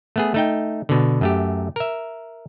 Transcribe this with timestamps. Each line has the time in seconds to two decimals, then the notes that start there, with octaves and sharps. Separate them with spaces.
0.16 A3 B3 G#4
0.34 A3 D#4 G5
0.89 B2 D3
1.21 F#2 A3 G4
1.76 A#4 E5